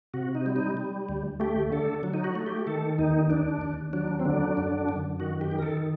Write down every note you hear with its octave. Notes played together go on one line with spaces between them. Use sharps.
C3 F#4
D#4
G3
D#4
G3
D2
A3 G4
D3 A4
F#3
D#4
F#4
A3
G4
D#3 A4
D#2 D#4
D#2 D4
D#2
F#3 D4
C4
D3 D4
F#2
F#2
D#3 F#4
G4
D#3
A#4
A4